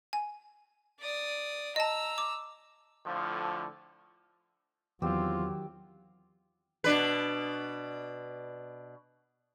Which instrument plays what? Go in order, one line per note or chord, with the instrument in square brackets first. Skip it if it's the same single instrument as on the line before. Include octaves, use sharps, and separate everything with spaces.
[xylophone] G#5
[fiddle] D5 D#6
[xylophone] D#5 A5 [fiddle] A#5 E6
[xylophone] D6
[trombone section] A2 D3 F3
[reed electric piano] E2 [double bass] D#3 F#3 [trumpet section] C4 F4 [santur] G4 E6
[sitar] B2 D4 B4